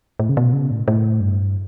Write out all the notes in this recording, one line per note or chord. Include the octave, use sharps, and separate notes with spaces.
A2
C#3
B2
C#3
A2
A2
G2